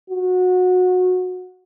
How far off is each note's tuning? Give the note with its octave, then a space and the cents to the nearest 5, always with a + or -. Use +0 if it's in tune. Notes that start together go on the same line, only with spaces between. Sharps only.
F#4 -20